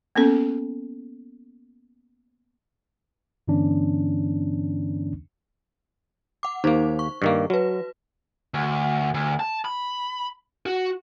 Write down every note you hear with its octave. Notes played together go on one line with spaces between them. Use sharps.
A#3 B3 C#4 A4
G2 D3 E3 B3 C#4 D4
F#5 D6
D#2 A#3 D#4 C5
C#6
G2 D#3 A#3
F#3 F#4 B4
D2
D2
A5
B5
F#4